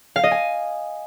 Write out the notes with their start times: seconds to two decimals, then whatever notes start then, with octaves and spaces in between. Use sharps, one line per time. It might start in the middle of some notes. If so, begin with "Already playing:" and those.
0.16 F5
0.24 D#5
0.31 G#5